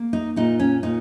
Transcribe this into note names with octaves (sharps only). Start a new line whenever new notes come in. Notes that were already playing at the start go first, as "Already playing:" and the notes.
Already playing: A#3
D#4
A#2 D#4
C#4
A#2 D#4